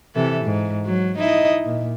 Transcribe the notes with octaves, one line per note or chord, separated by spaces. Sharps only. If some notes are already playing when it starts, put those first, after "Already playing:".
C3 E3 A4
G#2
F#3
D#4 E4 D#5
A#2